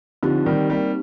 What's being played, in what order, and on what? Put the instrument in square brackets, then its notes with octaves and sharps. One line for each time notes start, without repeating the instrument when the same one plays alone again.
[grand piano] D3 F3 [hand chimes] C4 D#4 G4
[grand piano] D#3 G3
G3 A#3